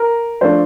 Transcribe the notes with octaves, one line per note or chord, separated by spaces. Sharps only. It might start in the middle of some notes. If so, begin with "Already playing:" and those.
Already playing: A#4
F3 A3 D4 C5